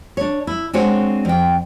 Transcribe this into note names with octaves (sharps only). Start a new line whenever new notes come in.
D4 C#5
E4
G#3 C4 D4 F#4 C#5
F2 G5